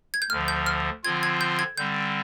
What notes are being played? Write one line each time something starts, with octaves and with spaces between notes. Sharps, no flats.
G#6
G6
D2 D3 F3 F6
G6
F6
D3 F3 C4 F4 G#6
G#6
G6
G#6
D3 G3 C4 G6